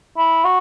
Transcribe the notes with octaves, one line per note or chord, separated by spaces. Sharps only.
E4
F#4